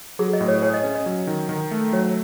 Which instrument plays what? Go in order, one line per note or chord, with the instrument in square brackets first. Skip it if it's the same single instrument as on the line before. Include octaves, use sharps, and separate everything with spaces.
[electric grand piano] F#3 [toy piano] G#4
[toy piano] D#5
[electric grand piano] A2
[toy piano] C#5
[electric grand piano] G#4 [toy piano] C#5
[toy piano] D#5
[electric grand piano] C#4
[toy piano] D#5
[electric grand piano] F#3
D#3
D#3
A3
[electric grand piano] F#3 [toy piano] C#5